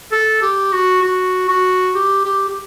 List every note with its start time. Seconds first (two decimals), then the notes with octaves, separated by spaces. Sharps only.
0.12 A4
0.42 G4
0.73 F#4
1.03 F#4
1.49 F#4
1.95 G4
2.25 G4
2.49 G4